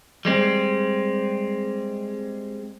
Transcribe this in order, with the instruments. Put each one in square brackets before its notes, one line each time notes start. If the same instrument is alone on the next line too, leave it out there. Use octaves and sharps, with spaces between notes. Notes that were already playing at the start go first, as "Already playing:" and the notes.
[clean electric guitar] G3 G#3 C4